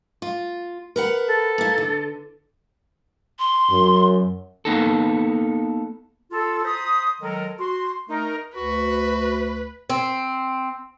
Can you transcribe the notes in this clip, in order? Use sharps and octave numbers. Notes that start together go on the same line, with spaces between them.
F4
A#4 B4 F#5
A4
A#3 E4
D3
C6
F#2
A#3 B3 D#4 A4
F4 A4
C5 A#5 B5 D#6
D#3 F#3 G#3 A4 A#4
F#4 C6
A3 D#4 A#4
D2 F#4 B4
C4